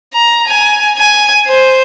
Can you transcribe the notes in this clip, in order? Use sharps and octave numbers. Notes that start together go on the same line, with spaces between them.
A#5
G#5
G#5
C5